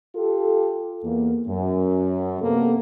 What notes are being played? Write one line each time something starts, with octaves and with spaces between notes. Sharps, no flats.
F4 G4 A4
E2 A#3
F#2
C3 A#3 B3 A4